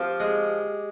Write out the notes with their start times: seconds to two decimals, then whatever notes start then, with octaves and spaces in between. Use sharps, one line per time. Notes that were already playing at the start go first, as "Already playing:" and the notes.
Already playing: F3 C4 G4
0.20 G#3